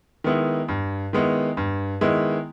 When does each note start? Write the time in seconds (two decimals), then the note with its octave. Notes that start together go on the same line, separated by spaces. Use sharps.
0.24 D#3 G#3 B3 E4
0.68 G2
1.13 D#3 G#3 B3 E4
1.57 G2
2.01 D#3 G#3 B3 E4